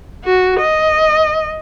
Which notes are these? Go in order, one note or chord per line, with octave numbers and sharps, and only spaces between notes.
F#4
D#5